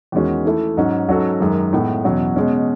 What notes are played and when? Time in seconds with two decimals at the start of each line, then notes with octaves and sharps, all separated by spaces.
0.12 E2 D#3 G#3 C#4 F#4
0.45 E3 A3 E4
0.77 G#2 F#3 C#4
1.08 G#2 F#3 C#4 F#4 A4
1.40 F#2 D#3 G#3
1.73 A2 G#3 B3 E4
2.05 E2 B2 F#3 C#4
2.36 B2 G#3 C#4